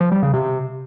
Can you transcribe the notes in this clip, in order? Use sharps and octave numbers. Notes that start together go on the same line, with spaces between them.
F3
G3
C#3
C3